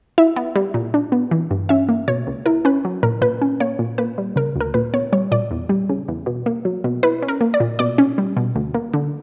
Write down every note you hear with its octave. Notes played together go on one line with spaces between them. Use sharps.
E4 E5
B3
G3
A#2
D4
B3
E3
G2
C#4 E5
A#3
B2 C#5
C#2
E4 A#4
C#4 B4
F#3
A#2 A#4
A#2 B4
C#4
A#3 C#5
A#2
A#3 B4
G3
C#3 A#4
D2 A#4
A#2 B4
B3 C#5
G3 C#5
A#2 D5
E2
G3
C#3
E2
B2
A#3
F#3
B2
E4 B4
C#4
A#4
A#3
D5
A#2
B2 D5
C#4
G3
B2
D2
A#3
D3